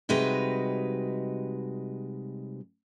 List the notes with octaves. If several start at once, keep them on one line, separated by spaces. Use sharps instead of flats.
C3 G3 G#3 D#4 F#4 B4